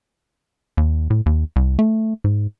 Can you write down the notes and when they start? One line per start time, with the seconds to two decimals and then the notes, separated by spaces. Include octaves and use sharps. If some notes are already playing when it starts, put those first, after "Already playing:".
0.77 D#2
1.10 A2
1.26 D#2
1.56 C2
1.79 A3
2.24 G#2